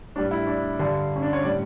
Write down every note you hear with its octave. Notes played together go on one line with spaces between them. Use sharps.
A2 G3 D4
E4
D4
G2 D3 G3
C#4
D4
C#5
A2 G3 D5